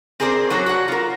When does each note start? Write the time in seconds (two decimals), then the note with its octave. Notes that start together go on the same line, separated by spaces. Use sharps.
0.20 C4 G#4 A#4 C5 D5
0.50 F#3 F#4 A4 C#5
0.66 F#4 F#5
0.88 F4 A#4